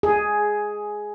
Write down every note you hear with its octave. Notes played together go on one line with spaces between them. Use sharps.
G#4